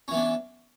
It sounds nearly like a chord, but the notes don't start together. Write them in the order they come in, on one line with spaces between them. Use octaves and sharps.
C#4 E3 B3 D4